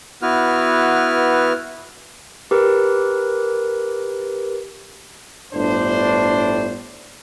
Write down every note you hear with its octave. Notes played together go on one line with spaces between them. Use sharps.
B3 E4 F#4 B4 F6
G4 A#4 B4
G1 A2 D4 C5